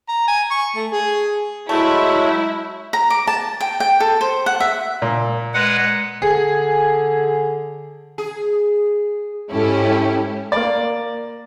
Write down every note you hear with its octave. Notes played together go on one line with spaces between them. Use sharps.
A#5
G#5
C#6
A3
G#4
F#3 G#3 A3 E4
A#5
D6
A5
G5
G5
A4
C5
F#5
E5
A#2
G#3 B4 F#5
D3 G#4
G#4
G#2 C#4 E4 G4 A4
A#3 D5